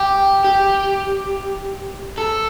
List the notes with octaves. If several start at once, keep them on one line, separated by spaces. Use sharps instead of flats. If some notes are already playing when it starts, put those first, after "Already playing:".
Already playing: G4
G4
A4